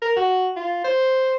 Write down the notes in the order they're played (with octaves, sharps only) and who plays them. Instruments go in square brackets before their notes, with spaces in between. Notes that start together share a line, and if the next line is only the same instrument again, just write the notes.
[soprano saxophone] A#4
F#4
F4
C5